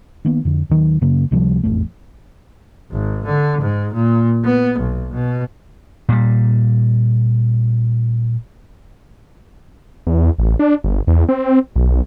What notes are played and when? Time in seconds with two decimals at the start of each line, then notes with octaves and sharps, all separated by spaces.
0.25 D#3 A#3 B3
0.45 F2 D3
0.70 D#2 D#3 F#3
1.01 F#2 C#3 A#3
1.31 C#2 C3 F3 G3
1.63 E1 A1 F2 A3
2.91 G#1
3.25 D3
3.61 G#2
3.94 A#2
4.44 B3
4.79 B1
5.14 B2
6.09 A#2 G3
10.07 E2
10.39 A1
10.59 D4
10.84 G1
11.07 E2
11.29 C4
11.76 B1